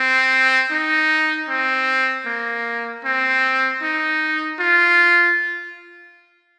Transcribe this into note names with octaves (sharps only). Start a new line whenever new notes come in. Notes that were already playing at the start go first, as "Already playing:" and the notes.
Already playing: C4
D#4
C4
A#3
C4
D#4
F4